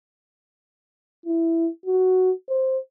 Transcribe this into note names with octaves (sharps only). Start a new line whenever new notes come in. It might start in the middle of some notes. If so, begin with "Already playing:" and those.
E4
F#4
C5